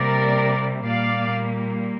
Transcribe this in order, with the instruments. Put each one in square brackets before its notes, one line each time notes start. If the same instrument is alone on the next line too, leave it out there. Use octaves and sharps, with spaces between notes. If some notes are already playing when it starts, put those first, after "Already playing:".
Already playing: [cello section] C3 G3 A#3 A#4 D5
A#2 G3 A#3 D5 F5